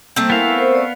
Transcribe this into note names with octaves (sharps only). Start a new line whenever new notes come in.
G3 A3 A#3 C4
B3 E4 A#4 F5 G#5
A#4 C5
D5